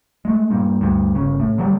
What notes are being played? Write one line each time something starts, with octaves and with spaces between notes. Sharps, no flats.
G#3 A3
G2 A#2
D2 G2
G1 C#3
A2
D3 F#3 G3